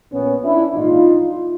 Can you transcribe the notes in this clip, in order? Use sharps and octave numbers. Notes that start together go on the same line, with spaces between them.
A#1 A#2 B3 C#4
D4 E4
A#1 G#2 E3 D#4 F4